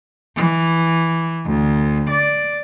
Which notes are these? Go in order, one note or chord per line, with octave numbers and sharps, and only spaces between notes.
E3
D2
D5